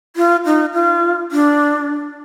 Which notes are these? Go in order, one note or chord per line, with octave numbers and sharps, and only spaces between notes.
F4
D#4
F4
D4